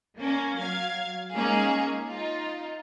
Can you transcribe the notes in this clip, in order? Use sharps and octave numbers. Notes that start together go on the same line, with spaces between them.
A#3 C#4
F#3 F5 G#6
G#3 A#3 C#4 D#4 G#4
D#4 F4